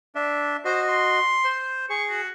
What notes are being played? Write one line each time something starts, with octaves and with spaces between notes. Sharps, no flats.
D4 E5
F#4 C5 D#5
C6
C5
G#4 C#6
F#4